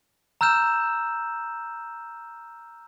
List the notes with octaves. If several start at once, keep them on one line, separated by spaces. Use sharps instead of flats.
A#5 E6 F6 G6 E7